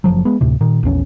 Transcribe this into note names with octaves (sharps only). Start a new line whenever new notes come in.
F#1 B1 F3 F#3
G#3 B3
D2 A2 C3
A#2 D#3
A#1 E2 C#4